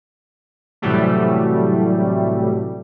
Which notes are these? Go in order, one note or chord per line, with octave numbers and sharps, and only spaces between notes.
A2 C3 E3 F#3 G3 A3